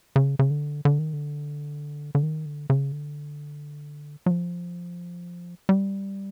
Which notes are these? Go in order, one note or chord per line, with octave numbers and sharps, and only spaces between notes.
C#3
C#3
D3
D3
D#3
D3
D3
D#3
D3
C#3
D3
F#3
F3
G3